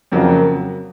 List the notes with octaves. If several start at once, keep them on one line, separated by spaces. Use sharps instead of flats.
F2 C#3 F#3 A#3